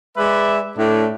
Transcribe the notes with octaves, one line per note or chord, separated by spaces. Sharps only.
G#3 B4 D5 E5
A2 D4